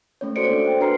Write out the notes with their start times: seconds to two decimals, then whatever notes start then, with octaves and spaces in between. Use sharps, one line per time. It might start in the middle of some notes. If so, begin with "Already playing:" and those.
0.21 A3 C#4 C#5
0.36 F#4 A4 C5 D5 C#7 D7
0.47 A#3 D4 A4
0.65 C5 G5
0.80 D4 F#4 B4 A#5 F6 C7